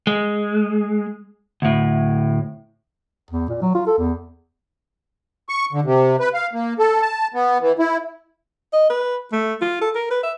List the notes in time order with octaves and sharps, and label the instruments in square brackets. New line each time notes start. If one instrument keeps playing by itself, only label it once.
[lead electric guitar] G#3
D2 A2
[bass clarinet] E2
A#2
F#3
F4
A4
E2
[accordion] C#6
D3
C3
B4
F5
A#3
A4
A5
B3
E3
E4
[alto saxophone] D#5
B4
A3
F4
A4
A#4
B4
E5